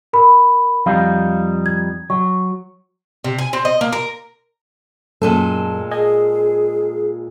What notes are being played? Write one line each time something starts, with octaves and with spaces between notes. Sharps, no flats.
A#4 B5
F2 G3 D#4 F5
G#6
F#3 C#6
C3
G#5
C4
D#5
A#3
A#4
F#2 A#2 G#3 A3 A4
G#4 D#5 G#5